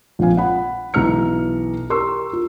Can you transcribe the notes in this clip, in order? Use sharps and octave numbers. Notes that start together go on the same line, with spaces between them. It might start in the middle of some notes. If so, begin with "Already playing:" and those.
A#1 F3 C4 F5 G#5
F#5 B5
B1 E3 A#5 F6 C#7
G4 A#4 C6 C#6 E6
F4